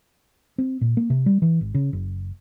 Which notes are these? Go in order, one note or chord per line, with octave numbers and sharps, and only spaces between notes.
C4
A#2
A#3
C3
G3
E3
G#1
C#3
F#1